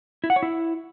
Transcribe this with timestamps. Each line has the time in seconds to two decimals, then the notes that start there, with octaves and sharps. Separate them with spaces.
0.24 E4
0.30 F#5
0.36 C#5
0.43 E4